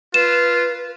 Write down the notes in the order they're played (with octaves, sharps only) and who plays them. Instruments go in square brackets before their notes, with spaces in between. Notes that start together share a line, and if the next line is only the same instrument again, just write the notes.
[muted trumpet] F4 [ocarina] B4 [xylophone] E7